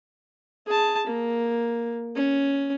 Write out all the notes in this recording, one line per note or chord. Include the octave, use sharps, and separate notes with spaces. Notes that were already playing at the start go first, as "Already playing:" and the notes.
G#4 A5
A#3
C#4